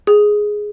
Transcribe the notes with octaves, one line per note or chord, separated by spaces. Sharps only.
G#4